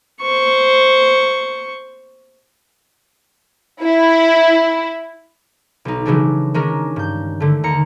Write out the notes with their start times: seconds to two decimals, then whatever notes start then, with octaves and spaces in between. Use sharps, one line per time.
0.21 C5 C#6
3.82 E4
5.85 B1 D#4
6.06 C#3 E3 F#3 G#3 A3 D4
6.54 D#3 G#3 C#4 D4 A#4
6.96 G2 G6
7.40 D3 A3
7.63 D#2 A#5 C#7